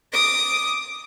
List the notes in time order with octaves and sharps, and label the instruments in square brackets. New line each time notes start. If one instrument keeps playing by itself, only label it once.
[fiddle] D6 D#6